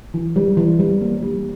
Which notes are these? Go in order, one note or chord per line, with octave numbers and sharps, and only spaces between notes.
E3
G3
E3
G3
A#3
G3